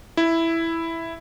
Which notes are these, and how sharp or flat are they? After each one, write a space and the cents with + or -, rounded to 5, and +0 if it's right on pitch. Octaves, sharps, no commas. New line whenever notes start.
E4 +0